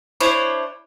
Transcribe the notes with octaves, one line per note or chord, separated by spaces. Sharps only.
D4 E4 C5 C#5